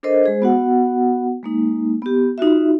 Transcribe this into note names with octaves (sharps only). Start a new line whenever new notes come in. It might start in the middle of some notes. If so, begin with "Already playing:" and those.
D4 A4 A#4 C5 D#5
G#3 G#4 C5
B3 F#4 F#5
G#3 A#3 D#4
B3 G4
D#4 F4 F#4 E5